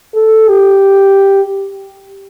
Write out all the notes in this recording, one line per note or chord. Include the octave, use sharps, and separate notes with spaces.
A4
G4